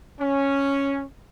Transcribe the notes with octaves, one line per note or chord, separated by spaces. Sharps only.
C#4